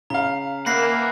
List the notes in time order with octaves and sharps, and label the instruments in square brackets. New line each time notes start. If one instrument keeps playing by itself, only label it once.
[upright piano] C#3 F5 [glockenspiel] A#5
[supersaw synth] A#3 [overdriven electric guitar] E5 F#5 [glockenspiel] B5 A#6 C7